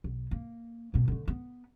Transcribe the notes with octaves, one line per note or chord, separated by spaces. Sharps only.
B1
A#3
A#1 B2
D3 A3
B3